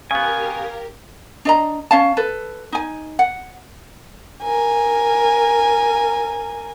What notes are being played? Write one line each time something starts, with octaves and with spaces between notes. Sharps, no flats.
C#3 B3 G4 A#4 F5 G#5
D4 D#5 A#5
C#4 F5 A5
A4 B4
D#4 G#5
F#5
A#4 G#5